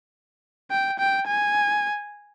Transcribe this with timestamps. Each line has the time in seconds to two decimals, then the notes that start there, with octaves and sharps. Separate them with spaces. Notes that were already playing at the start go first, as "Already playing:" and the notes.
0.71 G5
0.99 G5
1.28 G#5